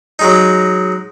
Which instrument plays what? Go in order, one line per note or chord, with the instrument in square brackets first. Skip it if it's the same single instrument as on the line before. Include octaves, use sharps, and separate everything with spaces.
[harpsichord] F#3 G#3 D#4